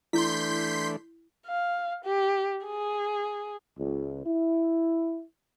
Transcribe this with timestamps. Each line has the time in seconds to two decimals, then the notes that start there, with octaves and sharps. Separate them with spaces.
0.13 E3 A3 D4 E4 C6 G6 B6
1.47 F5
2.05 G4
2.65 G#4
3.78 C#2
4.26 E4